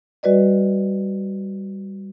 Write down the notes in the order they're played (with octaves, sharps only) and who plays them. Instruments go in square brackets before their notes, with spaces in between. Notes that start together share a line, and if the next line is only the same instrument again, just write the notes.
[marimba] G3 F#4 B4 D5 D#5